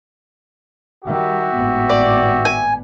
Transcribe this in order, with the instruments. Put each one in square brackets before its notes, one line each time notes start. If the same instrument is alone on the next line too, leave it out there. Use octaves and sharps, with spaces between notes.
[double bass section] D#3 G3 [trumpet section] F#4 G4 E5
[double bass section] G#1 A2 B3
[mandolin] D5
G#5